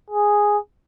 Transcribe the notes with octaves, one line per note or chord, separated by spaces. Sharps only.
G#4